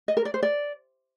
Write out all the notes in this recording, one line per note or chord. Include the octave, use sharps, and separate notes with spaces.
D#5
A#4
D5
C5
D5